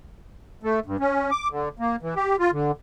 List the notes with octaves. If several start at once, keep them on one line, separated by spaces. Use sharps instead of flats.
A3
G2
C#4
D6
D3
A#3
E3
G4
F4
D3